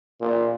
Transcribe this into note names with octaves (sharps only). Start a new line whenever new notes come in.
A#2